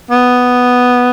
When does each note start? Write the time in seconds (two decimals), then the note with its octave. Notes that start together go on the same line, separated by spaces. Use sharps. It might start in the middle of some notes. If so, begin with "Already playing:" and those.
0.11 B3